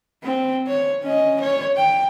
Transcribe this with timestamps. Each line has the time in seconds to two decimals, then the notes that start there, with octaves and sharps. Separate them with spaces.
0.23 C4
0.67 C#5
1.03 C#4 D#5
1.41 C#5
1.77 G5